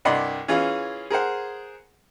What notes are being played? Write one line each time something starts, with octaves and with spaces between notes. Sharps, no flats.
C2 G2 D5 D#5 F#5 C6
E3 C#4 F4 G#4
G#4 A#4 C5 F#5